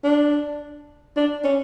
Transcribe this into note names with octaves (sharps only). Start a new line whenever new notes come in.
D4
D4
C#4